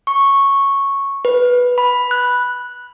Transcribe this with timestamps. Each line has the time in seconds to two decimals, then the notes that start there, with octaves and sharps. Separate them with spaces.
0.07 C#6
1.25 B4
1.78 B5
2.11 F#6